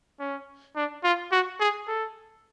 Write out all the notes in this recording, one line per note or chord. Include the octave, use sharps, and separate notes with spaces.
C#4
D4
F4
F#4
G#4
A4